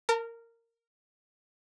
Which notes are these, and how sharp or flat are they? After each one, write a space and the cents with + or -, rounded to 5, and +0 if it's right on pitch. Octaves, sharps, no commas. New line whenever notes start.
A#4 -15 A5 +40